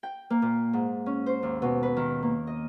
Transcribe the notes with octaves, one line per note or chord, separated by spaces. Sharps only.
G5
A#3
A#2
G#2
C#4
C5
D#2
B2
B4
D#3
A#3
D#5